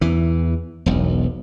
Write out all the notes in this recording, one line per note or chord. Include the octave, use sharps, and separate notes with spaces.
E2 E3
E1 B1